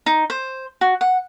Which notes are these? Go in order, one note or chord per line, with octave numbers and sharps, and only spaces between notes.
D#4
C5
F#4
F#5